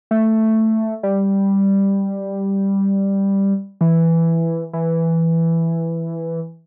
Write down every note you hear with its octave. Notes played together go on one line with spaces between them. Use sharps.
A3
G3
E3
E3